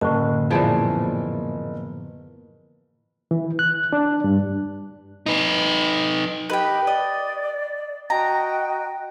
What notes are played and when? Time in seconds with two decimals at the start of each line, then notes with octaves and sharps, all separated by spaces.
0.01 F#1 A2 D3 A5
0.51 A#2 E3 F3 B3 G#4
3.31 E3
3.59 F#6
3.93 D4
4.24 G2
5.26 D#4 B4
6.50 G4 B4 D#5 G5
6.87 D5 D#5
8.10 F#4 D#5 G5 A#5